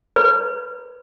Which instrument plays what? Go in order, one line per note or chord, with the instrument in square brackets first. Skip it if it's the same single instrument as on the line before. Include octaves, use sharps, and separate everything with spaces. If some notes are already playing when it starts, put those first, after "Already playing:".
[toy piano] B4